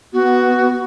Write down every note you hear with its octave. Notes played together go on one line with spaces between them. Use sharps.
B3 F#4